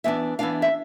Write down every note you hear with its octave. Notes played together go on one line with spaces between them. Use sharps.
E3 B3 D4 E5
E3 B3 D4 F5
E5